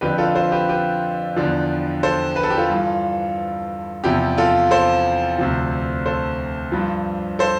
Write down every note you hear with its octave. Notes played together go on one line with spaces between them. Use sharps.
F2 D3 F3 G4 B4
F4 A4
A4 C5
G4 B4
G4 B4
E2 D3 F3
A4 C5
B4
A4
G4
F4 A4
G2 E3
E2 C3 F3 E4 G4
F4 A4
A4 C5
D2 C3 F3
A4 C5
G2 F3
A4 C5